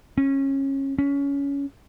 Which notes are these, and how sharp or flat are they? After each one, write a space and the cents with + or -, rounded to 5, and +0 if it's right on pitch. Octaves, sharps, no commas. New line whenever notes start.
C#4 -25
C#4 +20